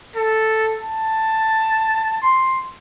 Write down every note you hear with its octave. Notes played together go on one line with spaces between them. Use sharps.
A4
A5
C6